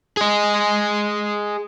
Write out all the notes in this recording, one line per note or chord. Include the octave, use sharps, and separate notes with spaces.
G#4 D#5